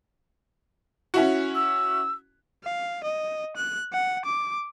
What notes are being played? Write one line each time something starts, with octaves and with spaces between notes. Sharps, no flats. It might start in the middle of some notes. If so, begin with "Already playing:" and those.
C#4 E4 F#4
E6
F5
D#5
F#6
F#5
D6